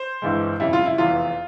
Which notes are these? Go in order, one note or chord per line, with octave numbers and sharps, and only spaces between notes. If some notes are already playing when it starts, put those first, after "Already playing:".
Already playing: C5
G1 G2 E3 G#3
F2 C#3 G3 E4
F4
E4
F1 E2 E3 F4